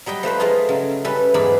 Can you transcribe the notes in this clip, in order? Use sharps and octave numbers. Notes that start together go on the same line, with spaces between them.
F#3 G3 D#5 G5
F3 A3 B4 C5
G#3 A3 D#4 F4 G#4
C#3 F#3
G3 C#4 E4 A4 B4
E2 G#2 F#3 G#4 D5 B5